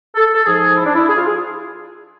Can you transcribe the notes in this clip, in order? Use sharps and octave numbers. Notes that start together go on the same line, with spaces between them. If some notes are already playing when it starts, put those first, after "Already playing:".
A4
A4
G#2 F3 G#4
E4
D4
E4
G#4
F4
G#4